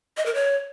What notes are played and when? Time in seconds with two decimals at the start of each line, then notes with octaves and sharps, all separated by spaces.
0.17 D#5
0.26 A#4
0.35 C#5